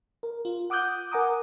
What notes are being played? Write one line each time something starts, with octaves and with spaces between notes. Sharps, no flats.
A#4
F4
F#5 D6 D#6 F#6 G6
A#4 F#5 G#5 A#5 D6 D#6